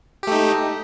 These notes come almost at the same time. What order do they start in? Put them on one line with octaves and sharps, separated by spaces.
G4 A3 D#4